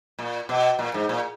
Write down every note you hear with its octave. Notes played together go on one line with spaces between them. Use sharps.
A#2
B2
A#2
G#2
A#2